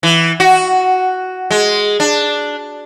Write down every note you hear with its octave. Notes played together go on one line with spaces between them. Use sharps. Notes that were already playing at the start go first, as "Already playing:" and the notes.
E3
F#4
G#3
D4